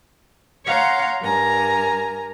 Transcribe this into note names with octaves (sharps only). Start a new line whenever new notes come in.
C#5 F5 F#5 A#5 C6
G2 A#4 G#5 A#5